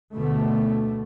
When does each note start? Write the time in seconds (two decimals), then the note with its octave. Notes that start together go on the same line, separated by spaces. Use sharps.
0.13 D2 B2 D3 A3